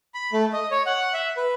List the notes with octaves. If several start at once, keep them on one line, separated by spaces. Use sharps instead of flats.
B5
A3
D#5
C#5
F#5
E5
B4